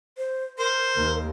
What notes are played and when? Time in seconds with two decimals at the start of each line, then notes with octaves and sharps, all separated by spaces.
0.17 C5
0.58 A#4 C5
0.98 D#2